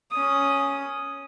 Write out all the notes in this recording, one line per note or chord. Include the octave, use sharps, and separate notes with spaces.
C#4 D#6